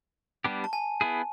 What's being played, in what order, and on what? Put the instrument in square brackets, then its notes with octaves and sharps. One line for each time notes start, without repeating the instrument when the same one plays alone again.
[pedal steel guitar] G3 B3 D4 G4
[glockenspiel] A5
G#5
[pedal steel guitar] B3 E4 G#4